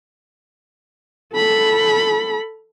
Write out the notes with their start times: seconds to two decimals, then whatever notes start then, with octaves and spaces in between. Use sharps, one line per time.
1.34 A4 B5